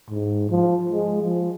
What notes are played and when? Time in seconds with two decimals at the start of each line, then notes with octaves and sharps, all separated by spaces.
0.11 G#2
0.50 F3
0.90 G#3
1.22 F3